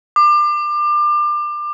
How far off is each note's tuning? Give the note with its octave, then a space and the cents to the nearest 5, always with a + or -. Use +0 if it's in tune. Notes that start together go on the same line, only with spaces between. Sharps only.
D6 +30